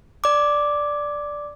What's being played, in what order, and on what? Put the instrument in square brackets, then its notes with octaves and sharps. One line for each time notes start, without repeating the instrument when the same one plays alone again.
[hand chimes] D5 D6